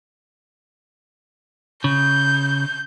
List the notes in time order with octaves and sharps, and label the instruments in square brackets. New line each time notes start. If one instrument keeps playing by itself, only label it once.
[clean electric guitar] C#3 [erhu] G6